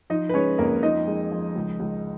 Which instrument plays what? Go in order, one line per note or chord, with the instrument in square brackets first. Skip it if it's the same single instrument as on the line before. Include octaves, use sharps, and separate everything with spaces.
[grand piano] F3 D#4 D#5
B4
G#3 C#4 C#5
F2 A#3 A#4
F3 D#4 D#5
G#3
F3
C#2
C#2